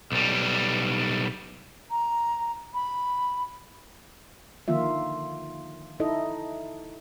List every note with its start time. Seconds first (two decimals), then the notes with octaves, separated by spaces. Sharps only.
0.12 B1 G3
1.89 A#5
2.74 B5
4.68 D3 D#3 F3 A#3 F4 E5
6.00 D#4 E4 A4 D#5